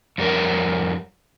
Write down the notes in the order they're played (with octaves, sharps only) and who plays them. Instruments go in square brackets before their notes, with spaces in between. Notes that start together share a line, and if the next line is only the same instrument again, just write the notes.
[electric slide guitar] F2 G3 A#4